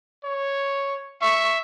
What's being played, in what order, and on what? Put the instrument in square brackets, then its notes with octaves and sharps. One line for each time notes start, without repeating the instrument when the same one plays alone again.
[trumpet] C#5
[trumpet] E5 [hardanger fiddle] C#6